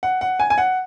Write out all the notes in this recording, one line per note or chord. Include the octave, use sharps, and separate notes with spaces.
F#5
F#5
G#5
G#5
F#5